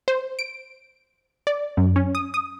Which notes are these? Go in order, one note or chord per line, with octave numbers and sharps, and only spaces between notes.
C5
D7
D5
F#2
C#4
D#6
D#6